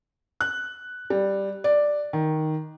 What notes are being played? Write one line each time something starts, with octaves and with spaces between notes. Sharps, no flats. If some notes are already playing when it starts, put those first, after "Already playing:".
F#6
G3
D5
D#3